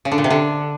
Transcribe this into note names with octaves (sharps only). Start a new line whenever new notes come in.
C#3
D3
A#2
C3
D3